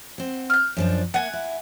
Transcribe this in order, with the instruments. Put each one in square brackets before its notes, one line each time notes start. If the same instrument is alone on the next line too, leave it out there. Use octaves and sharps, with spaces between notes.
[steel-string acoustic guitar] C4 F#5
[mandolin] F6 G6
[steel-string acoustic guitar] F#2 F3 D4
[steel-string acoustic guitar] A#3 E5 [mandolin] F#5 G#5
[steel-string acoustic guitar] E4